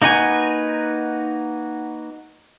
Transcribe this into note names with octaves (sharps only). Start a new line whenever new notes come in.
A#3 D#4 F#4 B4 G#5